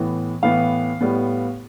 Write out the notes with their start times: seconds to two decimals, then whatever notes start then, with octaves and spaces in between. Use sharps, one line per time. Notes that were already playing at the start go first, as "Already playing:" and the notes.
Already playing: A2 E3 B3
0.43 A2 E3 B3 F5
1.01 A2 G3 B3